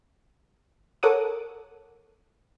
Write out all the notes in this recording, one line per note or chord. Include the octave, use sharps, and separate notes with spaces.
A4 A#4 C#5 F#5 D6 D#6